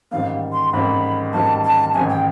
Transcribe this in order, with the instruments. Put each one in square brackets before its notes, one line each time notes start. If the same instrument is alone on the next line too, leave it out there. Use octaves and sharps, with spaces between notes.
[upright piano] A1 G#2 D#3 G3 A#3 [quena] F5
[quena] C6
[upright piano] A1 G#2 D#3 G3 A#3 [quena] B5
[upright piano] A1 G#2 D#3 G3 A#3 [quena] A5
[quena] A5
[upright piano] A1 G#2 D#3 G3 A#3 [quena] G#5
[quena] G5